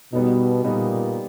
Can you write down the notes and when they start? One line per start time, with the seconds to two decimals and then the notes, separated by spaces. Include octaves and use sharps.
0.13 B2 G3 B3 D#4
0.64 A#2 G3 B3 D#4